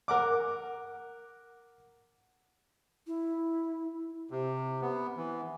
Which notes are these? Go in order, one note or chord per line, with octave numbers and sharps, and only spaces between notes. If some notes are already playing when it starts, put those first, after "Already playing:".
A#4 F#5 D6
E4
C3
B3
E3